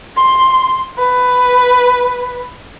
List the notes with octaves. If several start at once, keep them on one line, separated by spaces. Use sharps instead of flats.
C6
B4